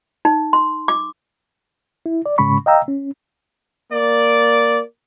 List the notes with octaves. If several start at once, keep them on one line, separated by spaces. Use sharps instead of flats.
D#4
C6
D6
E4
D5
G#2 C#3 G#3 C#4 B5 C#6
D#5 F5 G5 A#5 E6
C#4
A#3 D5